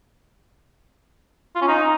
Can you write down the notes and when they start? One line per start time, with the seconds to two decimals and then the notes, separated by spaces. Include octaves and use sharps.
1.55 F4
1.62 C#4
1.68 D#4